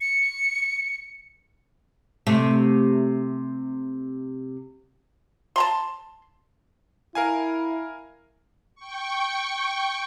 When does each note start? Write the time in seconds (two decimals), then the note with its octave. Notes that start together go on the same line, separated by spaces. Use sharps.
0.01 C#7
2.27 C3 A3
5.56 A5 A#5 C6
7.15 E4 A#4 F5 G#5
8.75 G5 C#6